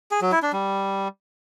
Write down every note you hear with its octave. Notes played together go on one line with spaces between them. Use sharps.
G#4
F#3
E4
D4
G3